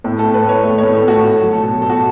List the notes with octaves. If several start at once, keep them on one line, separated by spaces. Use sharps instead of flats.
A2
A4
A3
B4
A2 C#5
A3
A2 C#5
A4
A3 F#4
A3
F#3
A4
B2
B2 A4
F#4